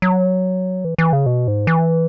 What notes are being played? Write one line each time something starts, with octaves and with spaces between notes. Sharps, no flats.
F#3
E3
E3
C#3
B2
G#2
E3